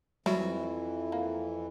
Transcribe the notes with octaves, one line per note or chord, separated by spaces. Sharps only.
F2 E3 F#3 G3 E4 F#4
A#3